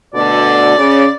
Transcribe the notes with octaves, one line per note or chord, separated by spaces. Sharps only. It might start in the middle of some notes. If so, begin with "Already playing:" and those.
D2 B2 D3 D5
C#3